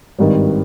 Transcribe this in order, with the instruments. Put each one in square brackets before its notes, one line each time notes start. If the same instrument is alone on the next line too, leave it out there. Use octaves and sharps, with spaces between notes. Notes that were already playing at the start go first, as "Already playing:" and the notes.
[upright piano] G#1 G2 D#3